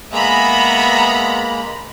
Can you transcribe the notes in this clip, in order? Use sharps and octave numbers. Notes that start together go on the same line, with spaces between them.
G#3 A#3 B3 G#4 E5 A#5 B5